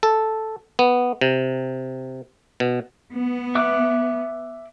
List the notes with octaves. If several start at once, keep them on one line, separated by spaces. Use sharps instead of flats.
A4
B3
C3
B2
B3
E5 D6 F#6